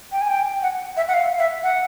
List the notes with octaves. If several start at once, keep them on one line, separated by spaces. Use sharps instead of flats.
G5
G#5
G5
F#5
E5
F#5
F5
E5
F#5